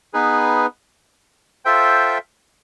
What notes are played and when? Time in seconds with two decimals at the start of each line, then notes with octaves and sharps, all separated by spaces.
0.13 B3 D#4 G#4 B4
1.65 F4 A4 C5 E5 G5